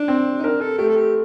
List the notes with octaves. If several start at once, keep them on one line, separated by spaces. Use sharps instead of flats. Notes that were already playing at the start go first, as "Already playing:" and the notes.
Already playing: D4
C4
D#4
D4 A#4
A4
A3 G4
A4
G4